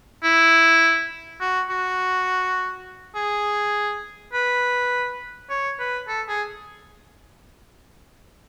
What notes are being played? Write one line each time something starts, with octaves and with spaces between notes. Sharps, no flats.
E4
F#4
F#4
G#4
B4
C#5
B4
A4
G#4